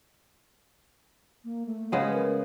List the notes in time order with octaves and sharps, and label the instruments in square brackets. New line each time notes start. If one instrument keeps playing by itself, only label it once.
[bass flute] A#3
A3
[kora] C#3 G#3 B3 [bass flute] B4
[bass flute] A#4